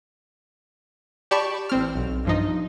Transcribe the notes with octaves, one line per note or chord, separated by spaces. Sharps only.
G4 D5 A5 B5 C#6
A1 C4 F6
B1
G2 F3 D#4